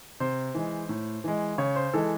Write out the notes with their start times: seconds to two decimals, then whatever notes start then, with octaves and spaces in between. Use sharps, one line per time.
0.20 C3 C5
0.54 E3 G#3
0.89 A2
1.24 E3 G#3
1.58 C#3 C#5
1.76 C5
1.93 E3 G#3 A4